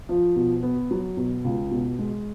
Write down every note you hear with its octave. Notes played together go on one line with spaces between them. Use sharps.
F3
B2
B3
F#3
B2
C#2
B2
G#3